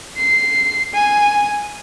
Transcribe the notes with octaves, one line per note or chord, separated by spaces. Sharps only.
C7
G#5